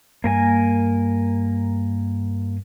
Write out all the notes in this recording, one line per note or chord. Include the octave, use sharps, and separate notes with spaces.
G2 A#3 A#4 G#5